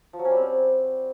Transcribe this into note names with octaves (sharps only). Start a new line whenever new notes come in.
F3
F#3
C#4
G3
C4